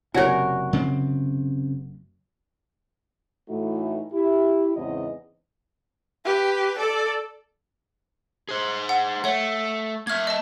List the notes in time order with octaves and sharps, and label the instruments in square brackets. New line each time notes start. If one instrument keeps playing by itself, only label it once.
[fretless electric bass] F#1 C3 [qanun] F#4 A#4 [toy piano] C#5 D5 G#5
[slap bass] C#3 C4
[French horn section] A2 E3 A3 D#4 F#4
E4 G4
E2 G#2 C#3 C4 D#5
[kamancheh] G4 B4
A4 D5
[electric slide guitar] G#4 C5
[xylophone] F#5
[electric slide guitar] A3 [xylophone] C#5 F#5
[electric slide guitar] A#3 E5 [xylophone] F6 G#6
[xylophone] D#5 A5